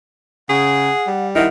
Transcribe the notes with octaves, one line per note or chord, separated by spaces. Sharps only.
C#3 G#4 F#5
G3
D#3 E4 F#5